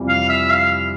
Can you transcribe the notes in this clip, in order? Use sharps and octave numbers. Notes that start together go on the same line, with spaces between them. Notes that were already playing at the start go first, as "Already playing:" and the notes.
Already playing: F2 C3 E3 G3
F5
E5
F5